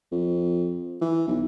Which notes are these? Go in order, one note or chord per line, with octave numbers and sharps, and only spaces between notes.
F2
E3
B1